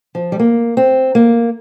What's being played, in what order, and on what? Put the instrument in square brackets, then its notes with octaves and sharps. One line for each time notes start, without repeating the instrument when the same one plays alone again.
[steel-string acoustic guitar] F3
G3
A#3
C4
A#3